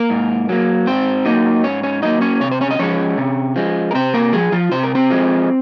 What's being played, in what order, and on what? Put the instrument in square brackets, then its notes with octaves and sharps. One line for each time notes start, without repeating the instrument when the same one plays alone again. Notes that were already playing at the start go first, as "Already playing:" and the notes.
Already playing: [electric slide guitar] A#3 A#4
G#2
F#3 A#3
G#2 C4 C5
F#3 A#3 D#4 D#5
G#2 C#4 C#5
C#4 C#5
F#3 A#3 D#4 D#5
C#4 C#5
C3 C#5
C5
C#4 C#5
D#5
F3 G#3 C#4 C#5
C3
F3 G#3
A#4
C3 C4 C5
A#3 A#4
F3 G#3 G#4
F3 F4
C3 C5
A#4
C4 C5
F3 G#3